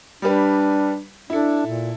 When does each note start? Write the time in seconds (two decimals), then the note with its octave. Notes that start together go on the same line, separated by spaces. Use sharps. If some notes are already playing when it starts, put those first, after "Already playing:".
0.22 G3 D4 G4 B4
1.30 D4 E4 A4
1.67 A#2